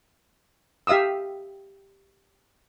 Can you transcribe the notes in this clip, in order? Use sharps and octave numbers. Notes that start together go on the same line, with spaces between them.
G4 E5 F5 D#6 E6